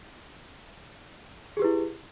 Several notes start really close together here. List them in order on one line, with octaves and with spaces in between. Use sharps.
G#4 G4 B4 E4